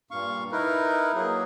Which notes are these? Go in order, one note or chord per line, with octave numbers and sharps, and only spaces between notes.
G2 A#2 F5 C#6
D#4 E4 A#4 B4
F#3 A#3 G#4